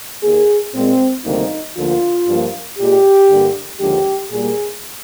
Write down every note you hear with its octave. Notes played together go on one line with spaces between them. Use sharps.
D#2 D#3 A#3 G#4
A#2 G#3 C4
D2 C3 D#3 G3 A#3 D#4
D2 D3 F3 A#3 F4
G2 F3 A#3
A#2 G#3 G4
G2 D3 G3 A#3
D#2 D3 F3 G#3 G4
A#2 G3 A#3 G#4